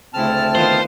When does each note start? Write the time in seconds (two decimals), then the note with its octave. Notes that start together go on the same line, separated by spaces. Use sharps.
0.14 D2 C#3 A3 C4 E4 A5 F6
0.55 D#3 B3 F4 C5